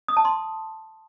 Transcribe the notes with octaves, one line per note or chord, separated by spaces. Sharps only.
D#6
A5
C6